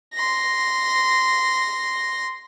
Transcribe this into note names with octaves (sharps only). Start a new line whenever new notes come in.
C6 A#6